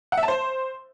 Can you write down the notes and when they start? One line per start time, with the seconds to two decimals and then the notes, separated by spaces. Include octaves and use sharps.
0.12 F#5
0.17 E5
0.23 A5
0.28 C5